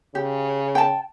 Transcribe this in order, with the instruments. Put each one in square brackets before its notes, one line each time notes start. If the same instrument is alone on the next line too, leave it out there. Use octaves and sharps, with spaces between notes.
[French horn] C#3 [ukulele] G4
[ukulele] G5 A5